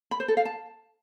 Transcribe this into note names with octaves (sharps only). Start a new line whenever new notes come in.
B5
C5
A4
F5
A5